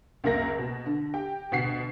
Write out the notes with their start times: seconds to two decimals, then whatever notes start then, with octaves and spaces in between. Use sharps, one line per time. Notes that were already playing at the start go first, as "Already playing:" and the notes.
0.24 C#2 F#2 A#3 A#4 A#6
0.58 B2
0.86 D3
1.14 G4 G5
1.51 D2 B2 F#5 B6 C7